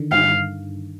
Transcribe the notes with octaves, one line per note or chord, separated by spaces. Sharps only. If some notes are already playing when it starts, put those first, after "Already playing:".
Already playing: D3 D#3
G2 F5